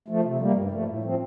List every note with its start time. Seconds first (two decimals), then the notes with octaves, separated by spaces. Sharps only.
0.08 F3 A3
0.24 C3
0.40 G3 A#3
0.55 G2
0.71 F3 A3
0.87 A2
1.03 F3 C4